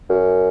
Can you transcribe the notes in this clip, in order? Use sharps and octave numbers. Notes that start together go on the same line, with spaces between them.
F#2